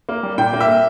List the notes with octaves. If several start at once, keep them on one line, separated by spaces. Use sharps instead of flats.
A#3
G3
A#2 G5
A#3
E5
A#3